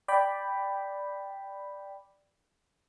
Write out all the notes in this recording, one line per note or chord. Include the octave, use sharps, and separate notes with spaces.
D5 G5 B5